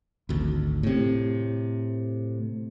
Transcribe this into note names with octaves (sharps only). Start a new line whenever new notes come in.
G#1 D2
A2 C3